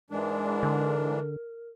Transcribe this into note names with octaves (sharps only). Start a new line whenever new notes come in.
G#2 E3 G#3 D4 A#4
D3